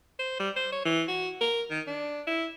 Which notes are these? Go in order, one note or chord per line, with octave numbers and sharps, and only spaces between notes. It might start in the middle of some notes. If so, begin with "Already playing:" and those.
C5
G3
C5
C#5
E3
F#4
A#4
D#3
D4
E4